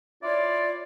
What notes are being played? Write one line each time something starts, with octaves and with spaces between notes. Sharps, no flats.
E4 F4 C#5 D5